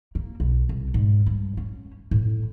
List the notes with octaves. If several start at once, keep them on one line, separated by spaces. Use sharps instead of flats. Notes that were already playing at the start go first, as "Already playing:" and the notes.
A#3
B1
C2
G#2
G2
C#4
A2